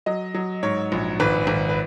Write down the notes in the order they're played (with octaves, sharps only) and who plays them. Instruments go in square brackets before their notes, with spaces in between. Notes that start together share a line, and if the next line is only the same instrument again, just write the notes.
[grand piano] F#3 D#5
F#3
G#2 C#5
A#1
G#1 B4
G#1
B4